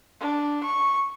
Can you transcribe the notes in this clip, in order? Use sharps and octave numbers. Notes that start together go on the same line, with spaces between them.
D4
C#6